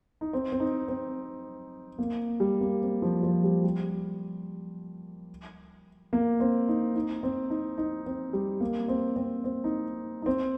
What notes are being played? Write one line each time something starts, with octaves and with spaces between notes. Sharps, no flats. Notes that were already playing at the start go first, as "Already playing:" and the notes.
D#4
C4
C4
D#4
C4
A#3
G3
A#3
C4
F3
F3
G3
G3
A#3
C4
D#4
D#4
C4
D#4
D#4
C4
G3
A#3
C4
C4
C4
D#4
D#4
C4